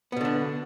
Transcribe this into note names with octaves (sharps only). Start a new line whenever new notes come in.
B2 D3 B3 D4